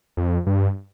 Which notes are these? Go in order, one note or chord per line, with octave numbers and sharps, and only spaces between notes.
F2
G2